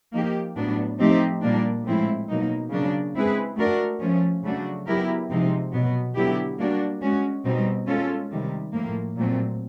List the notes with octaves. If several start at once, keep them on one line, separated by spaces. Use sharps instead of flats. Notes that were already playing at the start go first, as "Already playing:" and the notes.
F3 A#3 D#4 G4
A2 F#3 B3 D4
F3 A3 C4 D#4 G4
A#2 G3 A#3 D4
A2 F3 G#3 C4 E4
B2 F#3 A#3 D#4
C#3 F#3 A#3 D4
G#3 C4 E4 G#4 B4
A3 D4 F#4 A#4
F3 A3 C#4
C#3 F#3 A3 D4 F#4
F#3 B3 E4 G4 A#4
C3 F3 G#3 C4 D#4
B2 F#3 B3
D3 F#3 B3 E4 G4
G3 A#3 D4 F#4
G#3 C#4 F#4
B2 G3 C4 D#4
G#3 C#4 F4 A4
C3 D#3 G3
A2 F3 A#3
A#2 F#3 A3 C4